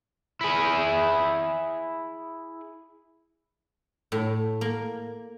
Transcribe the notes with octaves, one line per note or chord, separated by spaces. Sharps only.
E4 G#4
A2
A#3